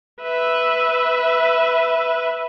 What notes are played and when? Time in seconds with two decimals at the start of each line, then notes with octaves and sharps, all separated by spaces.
0.22 B4 E5